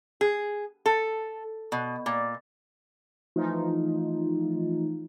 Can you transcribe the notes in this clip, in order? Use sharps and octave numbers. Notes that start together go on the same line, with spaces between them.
G#4
A4
B2
A#2
E3 F3 A3 D#4 F4